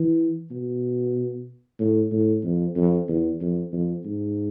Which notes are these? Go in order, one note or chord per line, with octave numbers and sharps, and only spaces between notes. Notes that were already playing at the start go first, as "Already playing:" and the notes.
Already playing: E3
B2
A2
A2
F2
F2
E2
F2
F2
G#2